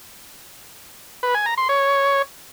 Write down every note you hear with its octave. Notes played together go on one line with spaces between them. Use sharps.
B4
G#5
A#5
C6
C#5